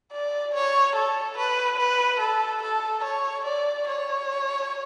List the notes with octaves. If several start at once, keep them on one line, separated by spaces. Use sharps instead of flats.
D5
C#5
A4
B4
B4
A4
A4
C#5
D5
C#5